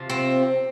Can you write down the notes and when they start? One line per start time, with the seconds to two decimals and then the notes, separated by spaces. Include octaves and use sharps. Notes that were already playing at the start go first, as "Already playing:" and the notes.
Already playing: C3 F3
0.10 C4